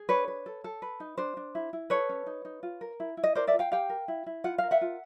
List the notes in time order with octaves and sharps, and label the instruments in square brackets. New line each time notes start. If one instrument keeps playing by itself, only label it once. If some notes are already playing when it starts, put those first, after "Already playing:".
Already playing: [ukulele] G#4
D4 B4 C#5
B4
A4
A4
B4
D#4
D4 C5
D4
E4
E4
A4 B4 C#5
C#4
D#4
D#4
F4
A#4
E4
E4
D#5
A#4 C5 D5
D5 E5
F4
F5 G5
G4 F5 G5
A#4
E4
E4
F4 F#5
A#4 F5
E5 F#5
F4